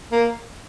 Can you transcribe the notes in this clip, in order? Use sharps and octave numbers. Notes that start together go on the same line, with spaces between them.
A#3